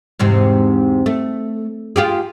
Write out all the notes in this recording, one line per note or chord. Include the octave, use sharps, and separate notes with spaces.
E2 G#2 C3
A3
F4 G4 G#4